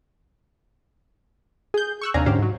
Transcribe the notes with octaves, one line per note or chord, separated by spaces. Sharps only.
G#4 G6
C#6 E6 F#6
D#2 C3 D4 F5 G#5 A#5
G#2 D3 C#4 G4 C5 F5
G#2 F#3